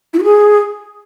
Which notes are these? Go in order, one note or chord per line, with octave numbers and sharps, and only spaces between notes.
E4
F#4
G#4